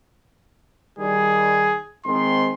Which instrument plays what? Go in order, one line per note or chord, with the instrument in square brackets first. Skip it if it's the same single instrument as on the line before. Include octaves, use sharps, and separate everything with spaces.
[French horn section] D#3 G3 [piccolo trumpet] G#4
[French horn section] D#3 G#3 C4 [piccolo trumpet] C6